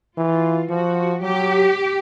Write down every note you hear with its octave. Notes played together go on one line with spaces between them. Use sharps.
E3 F4
F3 F#4
F#3 G4